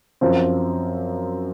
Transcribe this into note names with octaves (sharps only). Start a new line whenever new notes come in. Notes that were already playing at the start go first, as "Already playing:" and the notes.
F#2 F3 C4